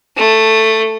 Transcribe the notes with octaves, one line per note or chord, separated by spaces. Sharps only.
A3